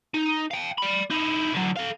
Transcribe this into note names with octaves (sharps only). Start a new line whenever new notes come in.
D#4
F5 G5
D5 B5
D#4 E4
D3 F#3
A4 F5